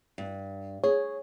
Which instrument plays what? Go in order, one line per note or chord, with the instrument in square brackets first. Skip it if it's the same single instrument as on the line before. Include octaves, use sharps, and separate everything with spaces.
[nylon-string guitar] G2
[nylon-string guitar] G#4 [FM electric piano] C#5